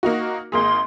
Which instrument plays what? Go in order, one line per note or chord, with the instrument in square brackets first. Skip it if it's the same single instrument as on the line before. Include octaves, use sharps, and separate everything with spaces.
[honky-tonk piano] A#3 D#4 F#4
[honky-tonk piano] G#1 A#3 G#4 [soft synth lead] C6